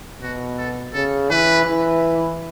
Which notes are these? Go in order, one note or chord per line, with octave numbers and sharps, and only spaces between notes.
B2 F#4
A4
C#3 A4
E3 B4
E3